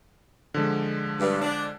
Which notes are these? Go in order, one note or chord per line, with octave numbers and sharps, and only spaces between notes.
D3 F3 G#3
G2
D4